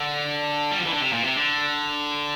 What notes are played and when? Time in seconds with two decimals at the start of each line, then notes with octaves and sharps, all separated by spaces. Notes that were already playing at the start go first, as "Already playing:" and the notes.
Already playing: D3
0.71 G3
0.78 F3
0.85 E3
0.93 D3
1.00 C3
1.12 A#2
1.24 C3
1.37 D3